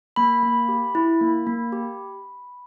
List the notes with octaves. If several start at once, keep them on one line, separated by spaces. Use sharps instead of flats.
A#3 B5
A#3
G4
E4
A#3
A#3
G4